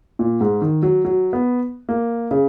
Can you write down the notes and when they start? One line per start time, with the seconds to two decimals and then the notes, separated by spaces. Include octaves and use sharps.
0.19 A#2
0.41 G#2
0.62 D#3
0.83 F#3
1.05 F#3
1.33 B3
1.89 A#3
2.31 C#3